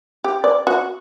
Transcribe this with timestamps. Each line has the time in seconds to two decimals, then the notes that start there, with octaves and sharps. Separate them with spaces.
0.24 G4
0.44 D5
0.67 F#4